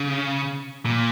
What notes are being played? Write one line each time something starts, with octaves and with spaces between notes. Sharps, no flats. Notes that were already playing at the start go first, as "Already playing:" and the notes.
Already playing: C#3
A#2